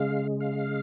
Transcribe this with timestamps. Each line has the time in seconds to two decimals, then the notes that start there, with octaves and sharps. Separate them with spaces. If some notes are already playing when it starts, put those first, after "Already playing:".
Already playing: C#3 G#3 F5
0.40 F5